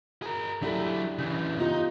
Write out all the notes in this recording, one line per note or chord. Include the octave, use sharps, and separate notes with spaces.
G#4 A#4
F#3 D4 E4 G4 A4
C#3 E3
B3 D#4 F4 G4